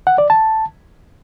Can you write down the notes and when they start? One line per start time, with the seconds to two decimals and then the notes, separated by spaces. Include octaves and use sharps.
0.07 F#5
0.18 D5
0.30 A5